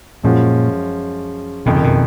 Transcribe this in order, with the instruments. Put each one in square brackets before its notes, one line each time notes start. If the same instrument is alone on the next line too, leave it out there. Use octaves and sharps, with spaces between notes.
[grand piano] F#2 F3 G#3 C#4 F#4 [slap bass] A#2
[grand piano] F#1 F2 D#3 [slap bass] B2
[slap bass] C#3
B2